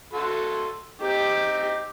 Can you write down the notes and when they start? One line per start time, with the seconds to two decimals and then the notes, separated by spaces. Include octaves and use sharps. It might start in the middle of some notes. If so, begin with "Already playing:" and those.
0.13 F#4 A4 C6
1.01 C4 D#4 G4